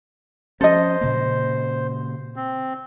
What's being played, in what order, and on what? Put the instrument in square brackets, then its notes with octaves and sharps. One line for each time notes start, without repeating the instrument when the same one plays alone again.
[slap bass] F3 C#4 [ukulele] A4 D#5 [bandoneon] C5
[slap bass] A#2 C#3 A#3
[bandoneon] C4